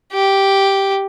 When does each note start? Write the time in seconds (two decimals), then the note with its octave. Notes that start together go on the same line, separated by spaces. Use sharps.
0.13 G4